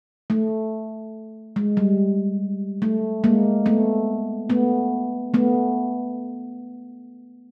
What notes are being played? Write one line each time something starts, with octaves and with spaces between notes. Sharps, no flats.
A3
G#3
G3
A3
G#3 A#3
A3 B3
A3 B3
A3 B3